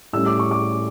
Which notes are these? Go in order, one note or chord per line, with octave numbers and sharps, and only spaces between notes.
A2 G3 C#4 E6
D6
C#6
D6